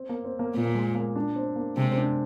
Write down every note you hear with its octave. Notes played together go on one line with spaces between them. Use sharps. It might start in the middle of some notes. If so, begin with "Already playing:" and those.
Already playing: C4
A#3
C4
A#3
A#2 A#3
A#3
G#3
A#3
D4
C4
A#3
C3 G#3
C4
D4